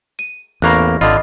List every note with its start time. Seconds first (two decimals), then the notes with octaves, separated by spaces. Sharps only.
0.19 D#7
0.62 A1 E2 A#3 A#5 B5 C#6 F#6
1.01 G#1 D3 F4 D#5 B5 D#6